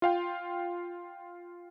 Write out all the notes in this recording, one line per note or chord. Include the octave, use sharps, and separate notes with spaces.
F4 F5 G5